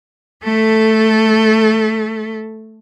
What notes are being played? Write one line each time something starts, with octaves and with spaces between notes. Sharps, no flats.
A3 A4